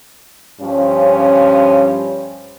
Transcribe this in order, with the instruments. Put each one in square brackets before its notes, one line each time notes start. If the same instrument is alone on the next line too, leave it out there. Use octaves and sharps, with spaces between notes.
[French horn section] G2 F3 C#4